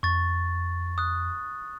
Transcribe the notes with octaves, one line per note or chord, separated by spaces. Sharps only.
F2 C#6 A6
D#6 F#6